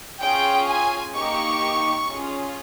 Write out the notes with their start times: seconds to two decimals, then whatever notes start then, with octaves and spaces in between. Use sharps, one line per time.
0.22 C#4 F4 G#4 G5
0.68 G#5
1.15 A#3 D#4 G4 C#6
2.09 C#4 F4 G#4